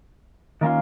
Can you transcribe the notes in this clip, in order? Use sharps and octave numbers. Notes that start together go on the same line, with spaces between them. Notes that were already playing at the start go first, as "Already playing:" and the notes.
D#3 A#3 C#4 F4